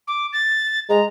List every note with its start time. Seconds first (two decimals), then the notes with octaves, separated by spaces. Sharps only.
0.07 D6
0.33 A6
0.90 G#3 A#5